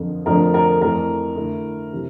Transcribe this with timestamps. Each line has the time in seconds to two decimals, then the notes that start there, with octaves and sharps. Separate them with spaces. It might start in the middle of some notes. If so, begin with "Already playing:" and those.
Already playing: F2 D3 F3 A#4
0.26 F2 D3 F3 A3 D4 A#4
0.54 A#4
0.81 F2 E3 A3 A#4
1.36 D3 A3 E4
1.93 C3 E3